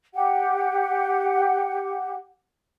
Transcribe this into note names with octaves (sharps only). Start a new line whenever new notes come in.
G4 F#5